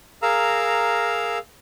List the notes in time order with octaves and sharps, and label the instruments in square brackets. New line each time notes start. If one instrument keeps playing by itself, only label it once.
[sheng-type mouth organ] G#4 A#4 F5 A#5 E6